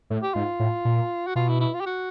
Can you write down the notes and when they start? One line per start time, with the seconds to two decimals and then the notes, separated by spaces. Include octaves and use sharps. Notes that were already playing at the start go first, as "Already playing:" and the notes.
0.10 A2
0.23 G4
0.34 G#2 F4
0.60 A2
0.85 A#2
1.27 F#4
1.35 B2 F4
1.49 E4
1.60 E4
1.74 F4
1.81 G4
1.86 F#4